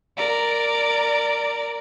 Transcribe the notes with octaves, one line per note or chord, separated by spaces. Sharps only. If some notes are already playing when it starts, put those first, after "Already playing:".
A#4 D5